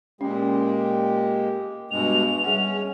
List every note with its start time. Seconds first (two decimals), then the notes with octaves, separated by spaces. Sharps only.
0.21 A#2 G#3 C#4 G4
1.91 G2 B2 G#3 F7
2.44 G3 C#4 G#4 F#5